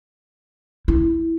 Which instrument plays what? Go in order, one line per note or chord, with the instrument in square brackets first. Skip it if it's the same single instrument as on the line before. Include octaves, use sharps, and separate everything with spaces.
[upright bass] E4